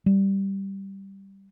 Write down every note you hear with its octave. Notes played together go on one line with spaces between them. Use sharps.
G3